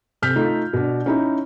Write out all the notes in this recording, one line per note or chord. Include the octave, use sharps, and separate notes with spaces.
C3 F6 G6 B6
A3 D#4 F4
B2 D4
C#4 D#4 E4